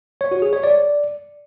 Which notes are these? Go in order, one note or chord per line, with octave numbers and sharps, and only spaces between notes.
C#5
F#4
G#4
C#5
D5